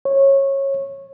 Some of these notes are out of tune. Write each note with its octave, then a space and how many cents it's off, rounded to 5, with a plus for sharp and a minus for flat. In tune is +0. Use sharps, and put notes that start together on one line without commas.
C#5 -20